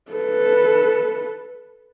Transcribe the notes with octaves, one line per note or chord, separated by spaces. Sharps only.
A4 B4